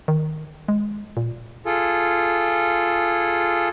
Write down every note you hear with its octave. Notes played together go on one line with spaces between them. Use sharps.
D#3
G#3
A#2
F4 G#4 A4